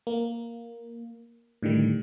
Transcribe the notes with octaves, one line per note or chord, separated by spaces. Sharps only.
A#3
A2 D3 D#3 G3